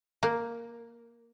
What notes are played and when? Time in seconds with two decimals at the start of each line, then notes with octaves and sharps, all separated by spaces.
0.23 A#3